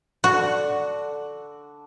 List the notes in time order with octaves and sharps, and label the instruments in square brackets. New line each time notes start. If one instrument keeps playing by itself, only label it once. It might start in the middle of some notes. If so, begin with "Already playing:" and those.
[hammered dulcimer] D3 [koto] F#4